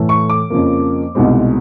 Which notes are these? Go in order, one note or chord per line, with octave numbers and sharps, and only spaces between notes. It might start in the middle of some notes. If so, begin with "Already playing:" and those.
Already playing: A2 E3 A3
C#6
D6
F2 C#3 F3 A#3
C2 B2 G#3 C4 D#4